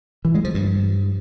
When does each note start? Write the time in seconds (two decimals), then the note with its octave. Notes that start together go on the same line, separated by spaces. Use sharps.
0.25 E3
0.35 G#3
0.45 F3
0.54 G2